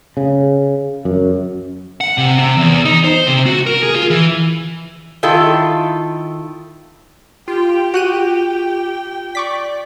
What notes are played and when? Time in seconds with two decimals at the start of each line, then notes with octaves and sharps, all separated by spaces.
0.17 C#3
1.05 F#2
2.01 F#5
2.18 C3
2.39 C3
2.57 E2
2.85 D#4
3.04 C5
3.27 C3
3.46 F#4
3.67 A#4
3.83 G#4
3.96 F4
4.10 E3
5.23 D#3 E4 F4 A4
7.48 F4 G4 G5
7.94 F#4 G5 F#6 D#7
9.35 D5 C#6 D6 B6